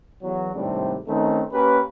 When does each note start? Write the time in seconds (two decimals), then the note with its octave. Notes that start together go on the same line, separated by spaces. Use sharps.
0.22 E2 F#3
0.53 G#1 A2 C3 G3 C4 D4
1.07 D#3 A3 C4 C#4 D#4
1.52 A#3 C#4 G4 A#4 B4